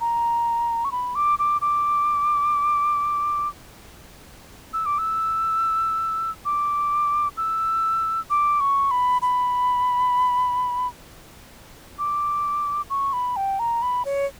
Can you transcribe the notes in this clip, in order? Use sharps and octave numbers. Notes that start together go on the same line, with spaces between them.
A#5
C#6
B5
D6
D6
D6
E6
D6
E6
D6
E6
D6
C#6
B5
B5
D6
C#6
B5
G5
A#5
B5
C#5